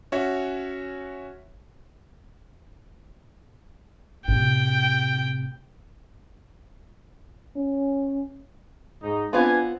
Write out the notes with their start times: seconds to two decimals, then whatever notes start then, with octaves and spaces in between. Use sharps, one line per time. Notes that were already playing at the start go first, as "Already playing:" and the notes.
0.12 C#4 F#4 C#5 E5
4.28 A2 C3 G5
7.56 C#4
9.02 G#2 D#4
9.33 B3 C4 D4 F4 B4 G#5